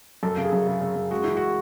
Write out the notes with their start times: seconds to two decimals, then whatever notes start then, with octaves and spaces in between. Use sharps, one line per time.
0.23 F#2 A4
0.37 C#3
0.45 G#4
0.53 F#2
0.67 C#3
0.81 C#3
0.96 F#2
1.11 G#3 F#4
1.24 E3 E4
1.37 F#4